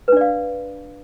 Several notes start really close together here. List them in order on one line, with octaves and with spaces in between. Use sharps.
B4 D4 D5 F5